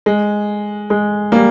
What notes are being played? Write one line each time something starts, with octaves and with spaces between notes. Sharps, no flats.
G#3
G#3
G3 A#3